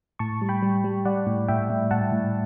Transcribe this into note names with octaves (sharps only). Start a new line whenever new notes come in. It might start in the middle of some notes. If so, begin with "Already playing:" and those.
A2 A5 C#6
G3
G5 B5
G3
G3
G3 D5 F#5
A2
A2 E5 G5
A2
A2 F#5 A5
A2